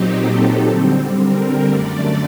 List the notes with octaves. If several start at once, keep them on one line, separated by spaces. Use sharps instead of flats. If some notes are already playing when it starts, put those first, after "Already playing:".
Already playing: A#2 F#3 C4 D#4 G4
A4
D3 G3 C4
A#4
F#2 D3 A3 D5